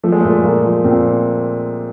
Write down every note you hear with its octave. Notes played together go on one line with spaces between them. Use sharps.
F3 A3
G#3
A3
A#2
A#2 A#3
F3
A#2 C4